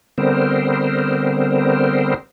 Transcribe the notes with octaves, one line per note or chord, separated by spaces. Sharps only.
D3 G3 B3 C4 A#4 C5